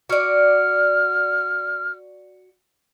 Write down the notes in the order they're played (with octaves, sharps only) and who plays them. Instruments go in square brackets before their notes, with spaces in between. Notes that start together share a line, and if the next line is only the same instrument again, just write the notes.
[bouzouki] F#4 D5 [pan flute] F6